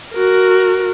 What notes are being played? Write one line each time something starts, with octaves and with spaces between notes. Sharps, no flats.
F#4 A#4